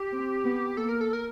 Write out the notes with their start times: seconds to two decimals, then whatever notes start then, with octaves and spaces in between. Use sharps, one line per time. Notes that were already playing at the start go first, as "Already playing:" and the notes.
Already playing: G4
0.12 C4
0.44 B3
0.77 A#3 A4
0.89 A#4
1.01 A4
1.13 A#4